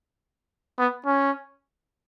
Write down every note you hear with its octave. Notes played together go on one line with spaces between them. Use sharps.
B3
C#4